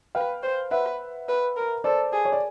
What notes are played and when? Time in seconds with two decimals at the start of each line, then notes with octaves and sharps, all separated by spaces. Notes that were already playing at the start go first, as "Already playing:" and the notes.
0.15 B4 F5 G5
0.43 C5
0.71 B4 E5 F#5
1.28 B4
1.57 A#4
1.84 A4 C5 D5
2.12 G#4
2.25 C#5
2.32 D5